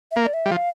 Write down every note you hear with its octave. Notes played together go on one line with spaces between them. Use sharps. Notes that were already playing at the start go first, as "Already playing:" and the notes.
E5
A#3 F5
D5
E5
G3
F3 F5